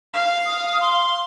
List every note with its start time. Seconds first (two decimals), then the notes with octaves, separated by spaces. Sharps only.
0.13 F5
0.46 D#6
0.81 C6